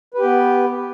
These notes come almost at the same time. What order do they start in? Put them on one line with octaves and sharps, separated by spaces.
B4 G4 B3